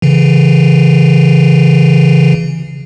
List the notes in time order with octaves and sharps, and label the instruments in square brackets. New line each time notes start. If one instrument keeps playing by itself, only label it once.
[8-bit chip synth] C#3 E3